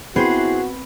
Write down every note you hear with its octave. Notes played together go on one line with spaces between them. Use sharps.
B3 C4 E4 F#4 G#4 B4 C5